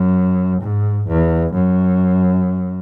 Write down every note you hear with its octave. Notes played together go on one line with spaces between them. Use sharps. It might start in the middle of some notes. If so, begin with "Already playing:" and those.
Already playing: F#2
G#2
E2
F#2